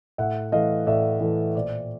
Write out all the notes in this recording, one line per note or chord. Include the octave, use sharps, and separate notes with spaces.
A2 E5 F#5
E3 A3 D#5 F5
A2 D5 E5
E3 A3
A#2 C5 D5